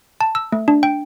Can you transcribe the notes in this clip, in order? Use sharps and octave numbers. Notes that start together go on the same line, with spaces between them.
A5
E6
A3
D4
G5